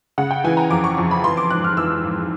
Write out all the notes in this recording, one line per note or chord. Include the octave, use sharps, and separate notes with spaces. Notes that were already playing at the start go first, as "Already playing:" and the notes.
C#3 F#5
G5
E3 G#5
A#5
F2 D6
C#6
F2 C#6
B5
E3 C6
D6
G#2 F#6
F6
E3 E6
G#2